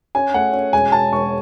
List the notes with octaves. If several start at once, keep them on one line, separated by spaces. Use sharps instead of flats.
C#4 G#5
A3 F#5
C#4
E1 G#5
E1 A5
E1 C#6